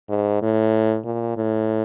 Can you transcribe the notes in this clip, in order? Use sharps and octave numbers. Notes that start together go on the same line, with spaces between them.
G#2
A2
A#2
A2